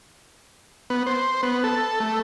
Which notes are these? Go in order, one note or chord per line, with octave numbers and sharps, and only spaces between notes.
B3
C5
B3
A4
A3